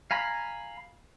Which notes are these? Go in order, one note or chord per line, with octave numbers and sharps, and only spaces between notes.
F5 G#5 A#5 B5